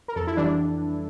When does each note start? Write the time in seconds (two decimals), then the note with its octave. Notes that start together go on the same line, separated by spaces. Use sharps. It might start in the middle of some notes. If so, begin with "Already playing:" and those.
0.08 A#4
0.16 F2 A4
0.27 E4
0.37 E3 G3 D4